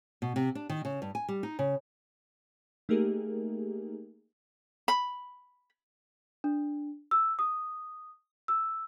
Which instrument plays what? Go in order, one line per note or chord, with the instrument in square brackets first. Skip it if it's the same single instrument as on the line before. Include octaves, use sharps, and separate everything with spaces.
[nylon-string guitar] B2
C3
D4
D#3
C#3
G2
G#5
G3
D#4
C#3
[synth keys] A3 A#3 D#4 G4 G#4 A#4
[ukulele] B5
[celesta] D4
E6
D#6
E6